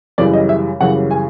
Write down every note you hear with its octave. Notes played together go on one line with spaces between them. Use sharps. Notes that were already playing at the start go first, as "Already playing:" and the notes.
F#2 C#3 E3 G3 D5
D#5
E5
F#2 C#3 E3 G3 F#5
G#5